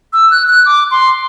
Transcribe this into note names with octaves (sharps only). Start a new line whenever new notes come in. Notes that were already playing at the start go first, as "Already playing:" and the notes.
E6
F#6
F#6
D6
C6